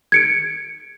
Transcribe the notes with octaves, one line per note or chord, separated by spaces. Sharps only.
G#6 C#7 D7